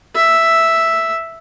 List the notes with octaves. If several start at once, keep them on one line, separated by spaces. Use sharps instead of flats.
E5